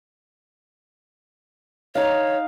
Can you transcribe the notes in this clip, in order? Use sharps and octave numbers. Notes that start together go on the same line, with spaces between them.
D#4 C#5 F5